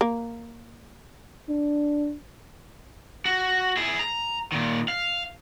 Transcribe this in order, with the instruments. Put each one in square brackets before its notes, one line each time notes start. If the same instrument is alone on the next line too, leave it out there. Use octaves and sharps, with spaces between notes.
[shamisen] A#3
[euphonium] D4
[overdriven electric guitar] F#4
E4 G#4
A#5
A#2 D#3
F5